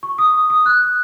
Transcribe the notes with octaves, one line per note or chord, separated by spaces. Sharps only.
C#6
D#6
D#6
F#6